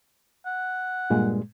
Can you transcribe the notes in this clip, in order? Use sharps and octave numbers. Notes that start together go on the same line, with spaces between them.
F#5
G2 A#2 G#3